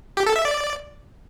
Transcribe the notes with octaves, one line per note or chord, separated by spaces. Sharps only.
G4
A4
E5
D5